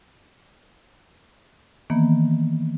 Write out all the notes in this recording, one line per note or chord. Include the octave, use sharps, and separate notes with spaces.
D#3 E3 A#3 B3